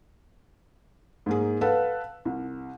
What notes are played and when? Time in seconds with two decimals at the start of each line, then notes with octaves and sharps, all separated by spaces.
1.26 G#2 A#3 G#4
1.61 A4 B4 F5 F#5
2.25 C2